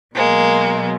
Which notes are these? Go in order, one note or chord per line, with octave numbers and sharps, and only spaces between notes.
B2 F#3 G#3 A#3